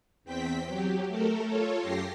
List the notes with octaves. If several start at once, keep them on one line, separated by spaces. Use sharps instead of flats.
E2 C4 G5 B6
F#3 G4
A3 A4 A#4
F4 A4 C#5
F#2 G4 A#6 C7